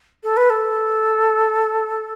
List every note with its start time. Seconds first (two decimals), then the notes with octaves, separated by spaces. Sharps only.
0.23 A4
0.37 B4
0.50 A4